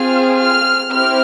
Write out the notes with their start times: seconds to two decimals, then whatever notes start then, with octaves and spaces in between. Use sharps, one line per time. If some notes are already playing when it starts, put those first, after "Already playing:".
Already playing: C4 F4 G#4 F6
0.38 F6
0.92 C4 E4 G4 F6